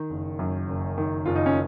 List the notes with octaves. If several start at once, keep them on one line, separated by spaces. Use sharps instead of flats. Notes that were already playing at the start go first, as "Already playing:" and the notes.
Already playing: D#3
F#1
F#2
F#1
D#3
F#1 F4
D#4
C#4